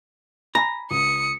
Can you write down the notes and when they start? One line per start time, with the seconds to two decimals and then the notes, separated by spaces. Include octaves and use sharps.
0.55 G#5 A#5 B5
0.91 C#2 D#6 C#7